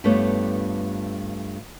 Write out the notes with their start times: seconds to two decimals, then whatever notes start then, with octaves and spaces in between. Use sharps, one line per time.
0.04 G2 A3 B3 F4 G4 C#5